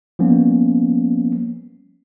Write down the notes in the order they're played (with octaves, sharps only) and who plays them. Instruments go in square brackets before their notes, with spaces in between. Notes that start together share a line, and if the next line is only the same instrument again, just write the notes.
[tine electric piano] F3 G3 A#3 B3 C#4